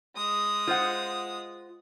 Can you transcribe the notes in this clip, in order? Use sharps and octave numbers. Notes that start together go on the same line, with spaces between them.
G#3 D#6
F4 C5 F#5